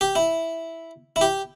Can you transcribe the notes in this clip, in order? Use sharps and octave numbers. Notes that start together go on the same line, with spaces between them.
G4
E4
E4
G4